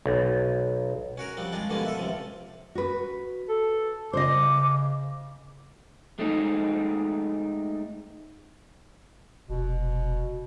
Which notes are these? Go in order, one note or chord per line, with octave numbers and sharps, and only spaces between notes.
B1
C#4 F#4 A#4
F3 G3 C4
G#3 D4 F4
B2 D3 F3 G3 A#3 C#4
A4 E5
C#2 C3 F3
F#4 B4
A4
C#3 C5 D#5 D6
G#3 A3 C4 D#4
F1 B2